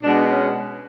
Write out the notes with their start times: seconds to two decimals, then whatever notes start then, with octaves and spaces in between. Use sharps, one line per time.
0.02 B2 G#3 B3 D4
0.22 D4
0.29 C#4